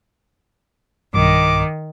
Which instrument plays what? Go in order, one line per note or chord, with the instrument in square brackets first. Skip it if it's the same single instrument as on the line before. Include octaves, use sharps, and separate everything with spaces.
[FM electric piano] B1 G2 [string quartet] D#3 [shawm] D6